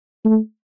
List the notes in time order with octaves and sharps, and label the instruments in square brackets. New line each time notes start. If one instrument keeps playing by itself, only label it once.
[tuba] A3